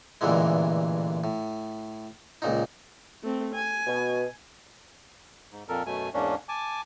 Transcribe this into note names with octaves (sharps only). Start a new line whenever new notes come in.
A1 G2 A#2 D3 E3 G#3
A2
C#2 A#2 D#4
A3 C4
G#5
B2
G#2
F2 A#2 A4 A#4
F#2 B2 A3 G#5
E2 G#2 A#3 C#4 D4
G#5 A5 D6